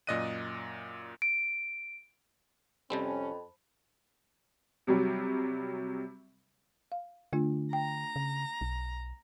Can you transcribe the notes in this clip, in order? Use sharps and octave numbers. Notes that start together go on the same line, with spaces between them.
F#2 A#2 D5 D#5 F#6 D#7
D7
F2 C3 G3 C4 C#4 C5 A5 B5
C3 F#3 G3
F5
D3 A3 D4 F4
G5 A#5
C#3
B1